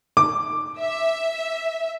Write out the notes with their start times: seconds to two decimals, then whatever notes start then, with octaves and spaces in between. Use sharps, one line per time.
0.17 D6
0.79 E5